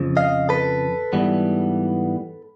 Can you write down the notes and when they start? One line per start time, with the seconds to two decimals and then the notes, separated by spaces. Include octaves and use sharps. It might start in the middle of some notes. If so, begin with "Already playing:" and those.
Already playing: F2 C#3 F3
0.17 D#5 F5
0.49 A4 B4
1.13 G#2 E3 G3 B3